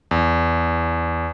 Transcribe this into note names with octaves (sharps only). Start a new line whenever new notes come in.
E2